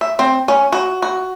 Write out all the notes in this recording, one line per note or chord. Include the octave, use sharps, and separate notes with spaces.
E5
C4
C#4
F#4
F#4